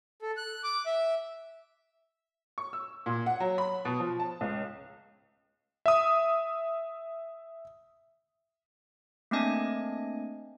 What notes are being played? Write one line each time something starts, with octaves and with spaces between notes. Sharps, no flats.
A4
F#6
D6
E5
C#6
E6
A#2
F#5
F#3
B5
B2
F3
A5
C#2
E5 D#6
A3 A#3 C4 D4 D#5 G#5